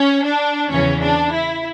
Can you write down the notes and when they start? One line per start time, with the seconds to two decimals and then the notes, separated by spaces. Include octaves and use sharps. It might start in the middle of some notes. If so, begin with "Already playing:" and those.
Already playing: C#4
0.25 D4
0.72 E2 C#3 E3 C#4
1.02 D4
1.33 E4